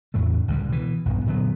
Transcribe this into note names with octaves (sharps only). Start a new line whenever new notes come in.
E2 A2 E3 A3
C#2 D3 G3
B2 E3
B1 G2 B3
A#2 D3 F#3 B3